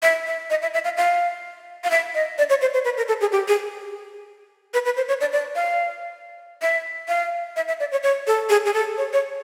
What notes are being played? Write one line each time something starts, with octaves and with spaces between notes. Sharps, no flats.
E5
E5
D#5
E5
E5
F5
F5
F5
E5
D#5
D5
C#5
C5
C5
B4
A#4
A4
G#4
G4
G#4
B4
B4
C5
C#5
D5
D5
F5
E5
F5
E5
E5
D5
C#5
C#5
A4
G#4
G#4
A4
C#5
C#5